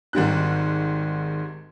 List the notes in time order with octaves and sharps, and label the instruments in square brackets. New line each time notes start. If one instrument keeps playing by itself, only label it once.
[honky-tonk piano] G#1 G#2 G3 F#6